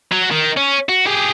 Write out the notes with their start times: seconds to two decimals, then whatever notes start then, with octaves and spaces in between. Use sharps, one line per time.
0.12 F#3
0.31 D#3
0.57 C#4
0.89 F#4
1.07 G4 G#4